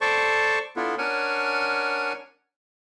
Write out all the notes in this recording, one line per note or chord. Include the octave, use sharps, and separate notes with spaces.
A4 C5 D5 A5 C#6
B3 D4 E4 F4 A4
C#4 D4 A#4 C#5 F#5 G#5